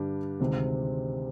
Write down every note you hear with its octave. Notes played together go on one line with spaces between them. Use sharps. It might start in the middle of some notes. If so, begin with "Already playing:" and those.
Already playing: G2 D3 G3 D4 G4
D2 C3 D#3 G#3 C4